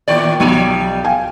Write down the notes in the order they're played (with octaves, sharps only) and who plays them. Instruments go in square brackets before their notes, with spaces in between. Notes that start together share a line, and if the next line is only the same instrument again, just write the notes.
[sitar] D#2 A#2 D5
[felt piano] B1 D#7 [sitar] F3 G3
[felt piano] F5 G5 G#5